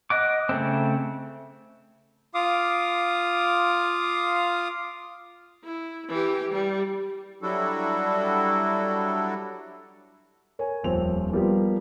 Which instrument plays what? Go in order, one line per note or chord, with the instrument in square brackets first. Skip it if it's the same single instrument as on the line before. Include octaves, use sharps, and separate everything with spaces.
[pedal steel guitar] D#5 F#5 D6
C#3 A3 C4
[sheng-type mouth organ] F4 F5 D6 D#6
[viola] E4
E3 G4
G3
[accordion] F#3 G3 D4 E4 F#4 A4
[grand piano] A#4 C#5 G#5
D#1 F2 C4 F7
F3 G3 A#3 B3 G4